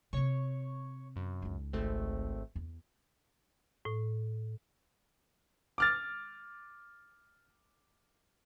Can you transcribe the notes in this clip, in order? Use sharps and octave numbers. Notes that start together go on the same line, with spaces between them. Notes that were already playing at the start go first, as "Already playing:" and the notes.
C3 C4 C#5 C#6
F#2
C#2 D#4
G#1 A3 C4
E2
A2
D6 F6 A6